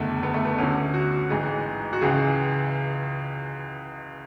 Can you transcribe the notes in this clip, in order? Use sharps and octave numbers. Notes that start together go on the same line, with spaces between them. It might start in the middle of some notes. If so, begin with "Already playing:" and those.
Already playing: F#1 E2 D3 A3
B3
A3
B3
D2 D3 C#4
F#4
F#4
A1 G#2 E3 G#4
F#4
C#2 C#3 E3 G#4